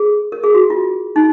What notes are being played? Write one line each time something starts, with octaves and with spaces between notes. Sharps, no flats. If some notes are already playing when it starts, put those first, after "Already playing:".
Already playing: G#4
A#4
G#4
F#4
F4
D#4